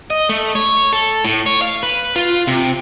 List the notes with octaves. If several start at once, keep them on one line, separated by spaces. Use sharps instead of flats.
D#5
A3
C#5
A4
A2
C#5
F5
B4
F4
C3